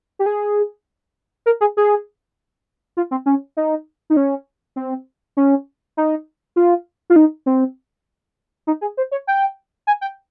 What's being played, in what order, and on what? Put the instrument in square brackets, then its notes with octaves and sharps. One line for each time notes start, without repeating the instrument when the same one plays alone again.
[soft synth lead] G4
G#4
A#4
G#4
G#4
F4
C4
C#4
D#4
D#4
C#4
C4
C#4
D#4
F4
F4
D#4
C4
D#4
G#4
C5
C#5
G5
G#5
G5